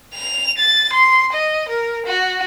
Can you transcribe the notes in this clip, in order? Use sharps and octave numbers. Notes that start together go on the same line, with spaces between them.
F7
A6
C6
D#5
A#4
F#4